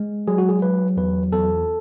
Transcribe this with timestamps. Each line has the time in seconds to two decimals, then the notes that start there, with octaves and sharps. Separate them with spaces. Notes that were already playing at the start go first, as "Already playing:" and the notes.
Already playing: G#3
0.28 F#3 G#4
0.38 F#4
0.49 G#4
0.62 F#3 B4
0.97 E2 B4
1.32 E2 A4